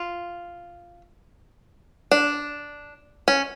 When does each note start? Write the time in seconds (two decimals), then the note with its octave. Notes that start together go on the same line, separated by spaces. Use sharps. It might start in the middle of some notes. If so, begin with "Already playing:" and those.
Already playing: F4
2.12 D4
3.28 C#4